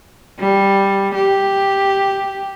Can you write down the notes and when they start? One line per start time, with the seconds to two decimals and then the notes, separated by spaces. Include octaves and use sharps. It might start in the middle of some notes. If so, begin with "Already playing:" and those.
0.39 G3
1.15 G4